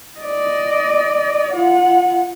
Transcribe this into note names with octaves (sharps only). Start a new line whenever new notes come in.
D5 D#5
F4 F#5